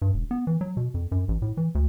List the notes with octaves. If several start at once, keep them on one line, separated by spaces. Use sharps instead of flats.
G2
E1
B3
E3
F#3
B2
F2
F#2
A1
A2
E3
D2